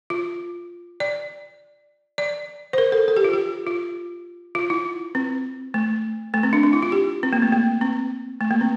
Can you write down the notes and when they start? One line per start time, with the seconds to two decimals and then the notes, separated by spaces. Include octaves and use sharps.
0.10 F4
1.00 D5
2.18 D5
2.73 C5
2.78 A#4
2.92 A4
3.08 A4
3.16 G4
3.24 F4
3.33 G4
3.67 F4
4.55 F4
4.70 E4
5.15 C4
5.74 A3
6.34 A3
6.43 C4
6.53 D4
6.63 D4
6.73 E4
6.83 F4
6.92 G4
7.23 C4
7.33 A#3
7.42 A3
7.53 A#3
7.81 C4
8.41 A3
8.51 A#3
8.61 C4